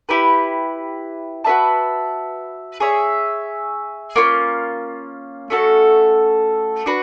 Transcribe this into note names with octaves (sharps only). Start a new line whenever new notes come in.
E4 G4 B4
F#4 B4 E5 A5
G#4 C#5 E5
A#3 C#4 F4
A3 C#4 F#4 A4
D4 F#4 B4